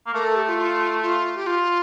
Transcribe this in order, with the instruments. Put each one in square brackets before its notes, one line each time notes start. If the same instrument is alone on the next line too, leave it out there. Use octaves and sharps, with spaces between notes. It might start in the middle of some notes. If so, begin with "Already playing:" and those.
[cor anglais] A#3
[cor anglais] A3 [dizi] A#4
[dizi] A4
G4
F4
F4
F4
G4
F4